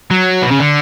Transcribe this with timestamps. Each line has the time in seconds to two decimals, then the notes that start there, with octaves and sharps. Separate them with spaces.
0.11 F#3
0.43 B2
0.51 C#3
0.60 D3